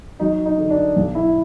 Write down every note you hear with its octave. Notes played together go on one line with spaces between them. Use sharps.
F#3 D#4
D#4
D3
D4
B1
E4